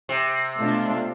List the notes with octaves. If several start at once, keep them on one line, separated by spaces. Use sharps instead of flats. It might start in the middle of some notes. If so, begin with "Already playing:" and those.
C3
B2 A3 D4 F4